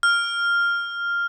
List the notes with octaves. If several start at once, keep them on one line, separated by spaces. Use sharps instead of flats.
F6